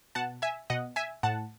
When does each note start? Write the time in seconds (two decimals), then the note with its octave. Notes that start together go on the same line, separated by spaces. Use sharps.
0.15 B2 F#5 A5
0.42 E5 G#5
0.70 B2 D#5 F#5
0.96 E5 G#5
1.23 A2 F#5 A5